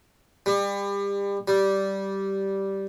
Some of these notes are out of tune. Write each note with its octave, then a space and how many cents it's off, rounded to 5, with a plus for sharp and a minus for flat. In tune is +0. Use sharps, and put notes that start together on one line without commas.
G3 +30
G3 -10